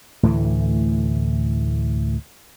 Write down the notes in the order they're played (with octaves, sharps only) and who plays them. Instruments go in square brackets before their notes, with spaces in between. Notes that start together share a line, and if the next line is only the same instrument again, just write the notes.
[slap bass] D2 A2 E3 A3